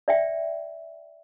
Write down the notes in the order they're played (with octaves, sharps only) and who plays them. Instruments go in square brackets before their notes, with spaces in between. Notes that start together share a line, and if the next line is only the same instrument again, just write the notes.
[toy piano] D5 E5 G5